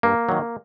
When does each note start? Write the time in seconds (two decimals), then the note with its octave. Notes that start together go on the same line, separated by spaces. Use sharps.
0.03 G2 A#3
0.29 D#3 F#3